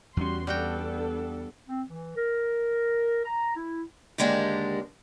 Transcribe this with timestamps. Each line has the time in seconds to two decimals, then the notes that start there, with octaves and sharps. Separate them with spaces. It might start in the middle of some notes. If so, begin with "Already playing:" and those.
0.17 E2 G3 C#4 F#4 C6
0.47 G3 B3 D4 F#4 A4 G5
1.69 C4
1.90 E3
2.16 A#4
3.25 A#5
3.56 E4
4.18 D#2 D3 G#3 A#3 D4 G4